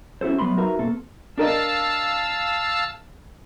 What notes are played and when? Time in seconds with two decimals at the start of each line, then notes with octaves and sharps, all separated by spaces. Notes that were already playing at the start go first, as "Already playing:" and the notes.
0.21 C#4 E4 F#4 A4 C5
0.39 F#3 A3 B3 B5 C6
0.57 D#4 F#4 A#4 B4 E5 A#5
0.79 B2 A#3 C4 A4
1.38 D4 A#4 D#5 F5 A5 E6